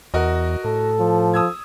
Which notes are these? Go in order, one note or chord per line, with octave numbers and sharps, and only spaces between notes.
E2 F#4 A#4 D#5
A2 A4
F3
D#6 E6 G#6